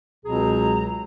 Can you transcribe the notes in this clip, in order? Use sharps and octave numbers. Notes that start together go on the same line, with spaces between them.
C#2 B2 F#3 C4 G#4 A#5